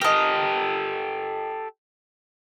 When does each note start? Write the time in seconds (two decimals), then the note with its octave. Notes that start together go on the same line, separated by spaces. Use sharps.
0.01 G4 A4 A#4 D#5